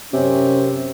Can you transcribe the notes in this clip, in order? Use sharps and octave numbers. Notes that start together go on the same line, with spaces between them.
F#2 C3 C#4